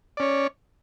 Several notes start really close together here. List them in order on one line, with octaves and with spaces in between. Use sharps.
D5 C#4 C#5